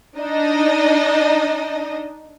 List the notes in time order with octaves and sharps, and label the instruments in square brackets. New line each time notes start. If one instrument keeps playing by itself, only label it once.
[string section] D4 D#4 D#5